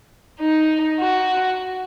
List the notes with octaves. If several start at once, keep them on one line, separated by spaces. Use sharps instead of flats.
D#4
F#4